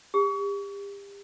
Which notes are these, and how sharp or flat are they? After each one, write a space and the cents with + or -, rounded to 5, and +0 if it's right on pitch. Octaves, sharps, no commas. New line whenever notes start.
G4 +35